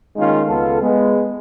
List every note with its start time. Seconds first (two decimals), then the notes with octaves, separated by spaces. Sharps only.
0.16 D#3 G#3 A#3 C#4 D#4 F4
0.47 C#2 B3 F4 A4
0.80 G#3 B3